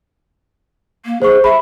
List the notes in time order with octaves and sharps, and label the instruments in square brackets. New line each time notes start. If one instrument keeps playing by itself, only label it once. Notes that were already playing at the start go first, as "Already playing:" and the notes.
[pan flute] A#3
[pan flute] G#4 [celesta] C5 C#6
[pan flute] E5 [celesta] B5